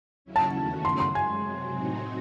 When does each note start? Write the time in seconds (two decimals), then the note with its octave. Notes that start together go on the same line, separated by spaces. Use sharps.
0.25 D#2 C#3 F#3 C#4 E4
0.36 A5
0.55 E2 D#3 A3 C#4 F#4
0.85 F#2 C#3 F#3 C6
1.00 C6
1.15 F#2 C#3 G#3 G#5
1.44 C3 F#3 C4
1.74 A2 F#3 C4 D#4 F#4